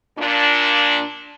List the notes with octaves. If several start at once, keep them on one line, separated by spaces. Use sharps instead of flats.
A#2 D4